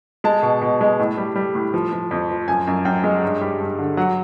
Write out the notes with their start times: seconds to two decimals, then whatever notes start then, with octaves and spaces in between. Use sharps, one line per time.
0.24 G#3 A5
0.42 B2
0.62 B2
0.81 G#3
0.99 A2
1.17 G3
1.36 G3
1.55 A2
1.74 F3
1.93 F3
2.11 F2
2.30 F3
2.48 F#2 G#5
2.67 F#2
2.85 F#2 G5
3.04 G#3
3.23 G2
3.41 G3
3.60 G2
3.79 D3
3.97 F#3 F#5